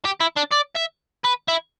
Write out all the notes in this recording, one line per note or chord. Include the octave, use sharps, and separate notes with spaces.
G4
E4
D4
D5
E5
B4
E4